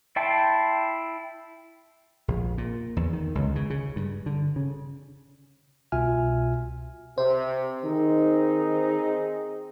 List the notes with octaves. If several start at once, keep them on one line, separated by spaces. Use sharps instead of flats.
E4 E5 G5 A5 C6
A#1
A#2
E2
D#3
C#2
C#3
C#3
G2
D3
C#3
C2 B2 F4 E5 G#5 F6
C3 C5
D#3 C4 D#4 G#4